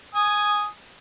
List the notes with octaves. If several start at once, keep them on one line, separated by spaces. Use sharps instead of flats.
G#5 D#6